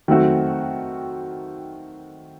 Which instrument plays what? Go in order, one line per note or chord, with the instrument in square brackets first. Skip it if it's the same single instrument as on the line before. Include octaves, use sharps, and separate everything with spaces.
[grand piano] D#3 F#3 A3 C4 F#4